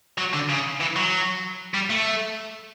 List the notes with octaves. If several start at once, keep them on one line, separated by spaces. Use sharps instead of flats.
F#3
D3
C#3
E3
F#3
G3
A3